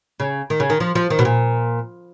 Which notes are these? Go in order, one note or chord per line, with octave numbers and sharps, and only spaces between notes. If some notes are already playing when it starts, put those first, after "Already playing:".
C#3
D#3
C#3
D#3
F3
F3
D#3
B2
A#2